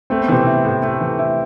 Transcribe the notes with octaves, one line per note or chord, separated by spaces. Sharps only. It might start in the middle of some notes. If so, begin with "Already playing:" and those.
A3 C4
B3
C3 E3 C4
E4
A2
A3
E3
E4